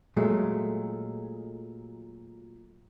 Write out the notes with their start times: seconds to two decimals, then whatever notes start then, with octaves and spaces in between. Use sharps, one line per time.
0.17 A#2 F#3 G#3 A3